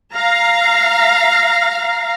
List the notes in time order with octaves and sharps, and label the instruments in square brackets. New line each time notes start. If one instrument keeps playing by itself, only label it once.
[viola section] F5 A#5